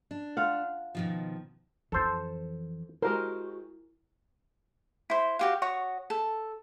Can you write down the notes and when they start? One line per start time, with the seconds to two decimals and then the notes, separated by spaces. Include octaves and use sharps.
0.11 D4
0.37 F4 F5 F#5
0.95 B2 D#3 F3
1.92 F2 E3 A4 C5
3.02 G#3 E4 F#4 G4 A#4 C5
5.10 E4 C5
5.39 F#4 G4 F5
5.62 F#4 C#5 C#6 D#6
6.10 A4